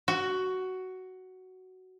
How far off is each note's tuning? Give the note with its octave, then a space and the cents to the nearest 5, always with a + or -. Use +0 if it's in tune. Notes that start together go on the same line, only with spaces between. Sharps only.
F#4 +10